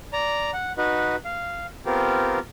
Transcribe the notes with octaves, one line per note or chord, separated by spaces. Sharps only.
D5 A#5
F#5
D#4 F#4 B4
F5
B3 C4 F4 G4 A#4